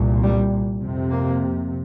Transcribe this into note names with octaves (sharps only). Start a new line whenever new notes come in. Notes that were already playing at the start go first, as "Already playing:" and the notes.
Already playing: C2 A#2
G3
F2 C3
A#3